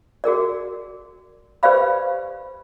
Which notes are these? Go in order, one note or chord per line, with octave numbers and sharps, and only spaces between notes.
F#4 G#4 A#4 D5
G4 B4 C5 D5 F5 B5